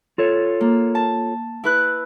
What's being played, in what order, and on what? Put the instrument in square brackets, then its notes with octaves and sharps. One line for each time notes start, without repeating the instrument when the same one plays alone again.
[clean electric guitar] F4 A4 C#5
[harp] A#3
A5
E4 B4 F#6